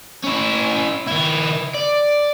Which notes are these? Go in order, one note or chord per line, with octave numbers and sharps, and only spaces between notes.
C#4 E4
D#3 E4
D5